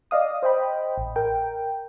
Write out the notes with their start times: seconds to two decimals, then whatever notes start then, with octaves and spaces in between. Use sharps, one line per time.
0.11 D5 D#5 F5 D#6
0.43 C5 D#5 G5 B5
0.98 A1
1.16 A#4 G5